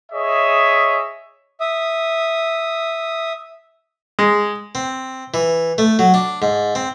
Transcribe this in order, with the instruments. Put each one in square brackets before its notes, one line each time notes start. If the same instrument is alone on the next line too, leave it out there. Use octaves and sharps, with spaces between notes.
[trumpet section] G#4 C#5 D#5 E5
[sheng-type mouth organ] E5 D#6
[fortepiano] G#3
[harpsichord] C4
E3
A3
F#3
D4
G#2
C4